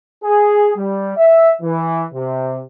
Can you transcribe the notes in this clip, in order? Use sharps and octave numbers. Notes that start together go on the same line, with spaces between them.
G#4
G3
E5
E3
C3